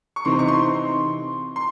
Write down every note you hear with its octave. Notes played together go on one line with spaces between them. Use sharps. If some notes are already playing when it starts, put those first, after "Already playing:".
C#6
C3 E3 C4 D#4 C6
C#6
C6
C6